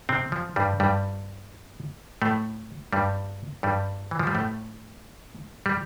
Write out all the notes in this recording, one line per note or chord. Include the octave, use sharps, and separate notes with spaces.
C3 C4
F3
G2 G3
G2 G3
A2 A3
G2 G3
G2 G3
E3
F3
G3
A2 A3
G3